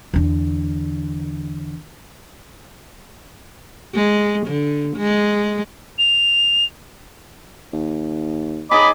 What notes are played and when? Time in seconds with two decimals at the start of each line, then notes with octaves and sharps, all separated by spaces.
0.14 E2 D3
3.94 G#3
4.46 D3
4.96 G#3
5.99 F7
7.73 D#2
8.71 D#4 G#4 D#5 B5 D6